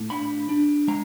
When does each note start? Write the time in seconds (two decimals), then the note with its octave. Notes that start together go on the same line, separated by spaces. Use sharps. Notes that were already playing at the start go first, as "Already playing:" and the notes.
Already playing: A2
0.10 D4 B5
0.49 D4
0.88 G#3 A#5